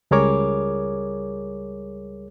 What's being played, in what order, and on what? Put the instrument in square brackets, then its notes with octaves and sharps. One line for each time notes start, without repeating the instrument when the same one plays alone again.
[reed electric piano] C#2 G3 G#4 A#4 C#5 D6